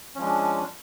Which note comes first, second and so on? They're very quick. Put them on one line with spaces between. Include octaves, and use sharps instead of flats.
C#4 F3 G#3 D4